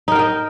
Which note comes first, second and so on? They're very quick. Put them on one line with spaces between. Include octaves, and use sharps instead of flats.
D#4 A#4 G5 D#5